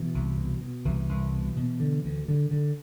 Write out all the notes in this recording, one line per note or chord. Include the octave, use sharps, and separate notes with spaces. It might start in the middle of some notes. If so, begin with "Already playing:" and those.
Already playing: B2 E3
C2
B2
B2
C2 E3
C2
B2
B2
D3
D2
D3
D3